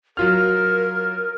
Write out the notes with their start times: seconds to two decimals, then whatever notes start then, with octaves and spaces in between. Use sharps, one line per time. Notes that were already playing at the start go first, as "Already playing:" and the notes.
0.17 F#3 F4 A#4 F6